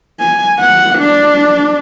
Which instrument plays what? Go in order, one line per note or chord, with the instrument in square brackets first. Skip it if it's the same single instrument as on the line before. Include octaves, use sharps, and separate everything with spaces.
[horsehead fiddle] G#5
F#5
D4